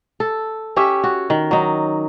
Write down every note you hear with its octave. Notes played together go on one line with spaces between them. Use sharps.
A4
C#4 G4 C#5 E5
F#4
D#3
F#3 D#4